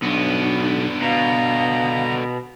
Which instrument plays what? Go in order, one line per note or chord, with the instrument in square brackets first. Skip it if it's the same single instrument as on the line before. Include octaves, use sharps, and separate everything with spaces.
[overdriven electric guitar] B1 [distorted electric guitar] D3 B3 [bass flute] D4
[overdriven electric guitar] B2 [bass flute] F5 [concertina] A#5